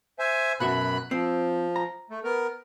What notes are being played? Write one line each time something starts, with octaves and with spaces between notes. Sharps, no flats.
C5 E5 G#5
F#2 B2 F#4 E5 B5 F#6
F3 C4
A#5
A3
B3 A#4